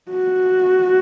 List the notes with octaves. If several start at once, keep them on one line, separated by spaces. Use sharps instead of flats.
F#4